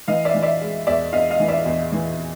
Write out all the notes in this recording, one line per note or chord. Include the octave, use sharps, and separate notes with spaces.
E3 D#5 F5
D5 E5
E3
D5 E5
G#3
E2 D5 E5
E2 D#5 F5
D#5 F5
E3
D5 E5
E2
E3